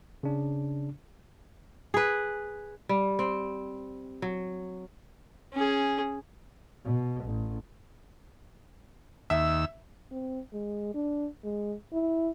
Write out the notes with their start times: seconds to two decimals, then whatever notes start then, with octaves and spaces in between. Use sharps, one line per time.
0.23 C#3 D4
1.94 G#4 B4
2.89 G3
3.19 C4
4.22 F#3
5.53 C#4 G#4
6.85 B2
7.25 A1
9.30 D#2 E5 E6
10.11 C4
10.53 G#3
10.94 D4
11.44 G#3
11.93 E4